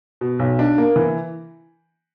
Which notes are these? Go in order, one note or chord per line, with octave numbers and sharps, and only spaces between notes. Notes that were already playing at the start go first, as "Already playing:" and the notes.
B2
B1
D4
A#3
E3